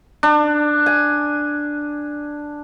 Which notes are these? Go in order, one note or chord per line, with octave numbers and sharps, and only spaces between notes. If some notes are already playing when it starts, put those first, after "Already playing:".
D4
G#5